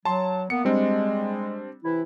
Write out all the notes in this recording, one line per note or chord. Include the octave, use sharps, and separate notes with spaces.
F#3 A5 C6
A#3 B3 C#7
G3 G#3 C4 D4
C3 E3 E4